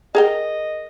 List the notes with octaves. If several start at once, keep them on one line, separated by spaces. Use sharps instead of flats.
G#4 A#4 D#5 G5